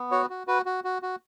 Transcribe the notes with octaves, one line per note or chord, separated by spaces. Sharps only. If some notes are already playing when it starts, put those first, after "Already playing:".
Already playing: B3
F#4 C#5
F#4
F#4 B4
F#4
F#4
F#4